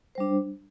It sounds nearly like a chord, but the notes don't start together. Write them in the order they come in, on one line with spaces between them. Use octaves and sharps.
C5 G3 D4